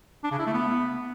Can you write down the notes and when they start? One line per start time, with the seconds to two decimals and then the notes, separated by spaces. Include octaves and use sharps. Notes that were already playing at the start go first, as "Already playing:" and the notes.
0.24 D4
0.31 C#3
0.39 E4
0.46 A3
0.54 B3